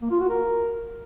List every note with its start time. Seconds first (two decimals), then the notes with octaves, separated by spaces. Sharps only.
0.02 A#3
0.11 F4
0.20 F#4
0.29 A#4